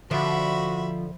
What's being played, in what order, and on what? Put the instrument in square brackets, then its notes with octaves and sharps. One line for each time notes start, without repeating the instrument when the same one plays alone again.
[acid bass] D3 [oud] F3 [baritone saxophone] F#4 [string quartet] E5 B5